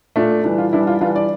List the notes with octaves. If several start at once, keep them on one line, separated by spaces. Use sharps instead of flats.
A#2 A3 D4
E3 G3 D4
F4
E3 G3 D4 E4
F4
E3 G3 D4 F4
D5